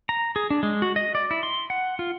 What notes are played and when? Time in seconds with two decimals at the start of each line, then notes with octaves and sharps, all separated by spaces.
0.09 A#5
0.36 G#4
0.50 D4
0.63 G#3
0.82 F#4
0.96 D#5
1.15 D5
1.31 E4
1.43 C6
1.70 F#5
1.99 F4